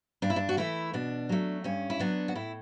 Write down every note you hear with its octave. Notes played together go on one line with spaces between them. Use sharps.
G2 D4
E4
D4
F#4
E3 A3 E4
B2 D4
F#3 A3
G2 C#4
E4
F#3 B3 D4
F#4
A2 E4